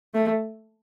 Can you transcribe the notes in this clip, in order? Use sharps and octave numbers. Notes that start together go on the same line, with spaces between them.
A3